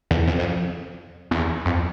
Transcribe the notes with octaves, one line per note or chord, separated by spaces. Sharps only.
E2
F2
F2
E2
F2